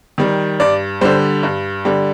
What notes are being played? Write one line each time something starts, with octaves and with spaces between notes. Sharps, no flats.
D#3 G3
G2 D5
D3 G3 C5
G2
D3 G3